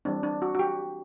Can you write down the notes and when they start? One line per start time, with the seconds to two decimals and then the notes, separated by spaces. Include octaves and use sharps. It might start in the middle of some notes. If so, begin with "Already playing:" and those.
0.05 E3 G3 C4 D4
0.23 D4
0.42 F#4
0.55 F#4
0.59 G4